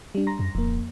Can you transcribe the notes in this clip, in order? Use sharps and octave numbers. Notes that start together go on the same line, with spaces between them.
G3 D4
A#5 C6 A#6
F#2
D1 F2 A#3